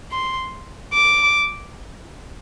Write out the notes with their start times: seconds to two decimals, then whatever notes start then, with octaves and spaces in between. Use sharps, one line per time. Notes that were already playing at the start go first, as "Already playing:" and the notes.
0.12 C6
0.93 D6